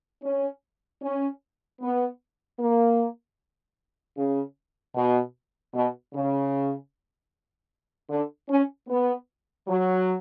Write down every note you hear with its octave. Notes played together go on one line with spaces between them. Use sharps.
C#4
C#4
B3
A#3
C#3
B2
B2
C#3
D3
C#4
B3
F#3